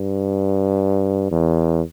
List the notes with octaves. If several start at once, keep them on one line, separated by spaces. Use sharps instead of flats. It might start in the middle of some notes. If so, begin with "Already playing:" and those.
Already playing: G2
E2